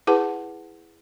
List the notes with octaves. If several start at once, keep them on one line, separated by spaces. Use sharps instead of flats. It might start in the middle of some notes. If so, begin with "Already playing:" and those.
E4 G#4 B4 F#5 A5